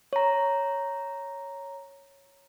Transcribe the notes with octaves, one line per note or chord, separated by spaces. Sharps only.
C#5 A#5